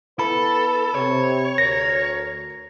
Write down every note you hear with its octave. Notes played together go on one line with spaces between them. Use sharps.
B3 E4 A4 B4 B5
C3 C#5
D2 A#4 A#6